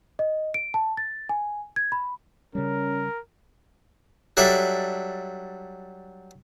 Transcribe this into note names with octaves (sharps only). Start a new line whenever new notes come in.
D#5
D7
A5
A6
G#5
G#6
B5
C#3 G3 C#4 A#4
F#3 G3 D4 A4 E5